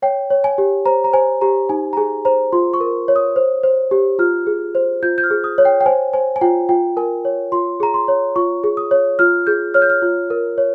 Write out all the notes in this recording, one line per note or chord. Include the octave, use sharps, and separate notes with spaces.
C#5 G5
C#5
G#5
G4
C5 A#5
A#5
C5 G#5
G4 A#5
D#4 G#5
A#5
G#4 G#5
C5 A#5
F4 C6
C#6
A#4
C#5
D#6
C5
C5
G4
F4 F6
G#4
C5
F4 G6
G6
F6
G#4
D#6
C#5
G5
G5
C5 G#5
C5 G#5
G#5
F4 G5
F4 G5
A#4 G#5
C#5
F4 C6
G#4 A#5
C6
C#5
F4 C#6
G#4
D#6
C#5
F4 F6
G#4 G6
C#5 F6
G6
F6
F4
A#4
C#5